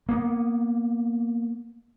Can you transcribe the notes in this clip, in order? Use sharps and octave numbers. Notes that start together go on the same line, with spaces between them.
A#3 B3